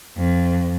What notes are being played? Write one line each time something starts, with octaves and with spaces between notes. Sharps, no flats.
F2